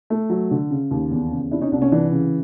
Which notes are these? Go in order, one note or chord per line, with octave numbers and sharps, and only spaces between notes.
A3
F#3
D3
C#3
D#2
E2
C#3
C3 D4 E4
C#4 D#4
C2 D4
C#4
E3 D4
C#3